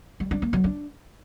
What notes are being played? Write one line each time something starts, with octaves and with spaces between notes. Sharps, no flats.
G3
D4
A#3
F#3
D4